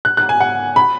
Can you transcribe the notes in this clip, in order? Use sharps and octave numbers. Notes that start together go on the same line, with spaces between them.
F#6
F#6
G#5
F#5
B5